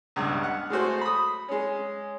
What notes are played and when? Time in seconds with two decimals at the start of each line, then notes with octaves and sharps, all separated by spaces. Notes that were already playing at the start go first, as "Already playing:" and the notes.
0.16 C#2 G2 B2
0.43 F#5 F6
0.70 G#3 A3 F#4 C5
1.01 B5 D#6
1.48 G#3 C#4